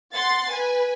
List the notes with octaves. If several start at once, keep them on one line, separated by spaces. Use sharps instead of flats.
F#5 C6 A6 C7
B4 G#5